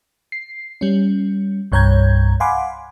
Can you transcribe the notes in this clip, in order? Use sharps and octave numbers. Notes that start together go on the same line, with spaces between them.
C7
G3 C#4
C2 G2 C#5 A#5 G6 G#6
F5 F#5 G#5 B5 C6 D6